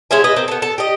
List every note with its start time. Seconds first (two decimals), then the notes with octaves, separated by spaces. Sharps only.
0.11 G#3 C#4 E5 G#5
0.24 B4 D#5
0.36 A#3 C4
0.48 B3 A4
0.62 A4
0.78 G4 D#5